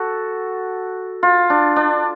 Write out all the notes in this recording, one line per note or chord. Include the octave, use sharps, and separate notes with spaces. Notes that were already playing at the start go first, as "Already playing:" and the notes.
Already playing: F#4 A4
F4
D4
D4